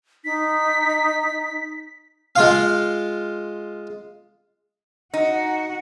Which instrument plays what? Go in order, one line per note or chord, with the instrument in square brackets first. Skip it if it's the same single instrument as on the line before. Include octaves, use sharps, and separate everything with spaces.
[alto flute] D#4 [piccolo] B6
[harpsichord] G#3 F4 F5
[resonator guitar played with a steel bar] D#4 [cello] F#4 F#5